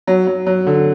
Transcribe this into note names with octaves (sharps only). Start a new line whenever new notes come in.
F#3
F#3
F#3
D3